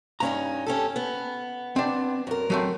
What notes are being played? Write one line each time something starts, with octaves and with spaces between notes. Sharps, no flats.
G2 C#4 D#4 A#5
C#4 G4 A4
B3
C4 D4
F#2 A#4
F#3 A3 C4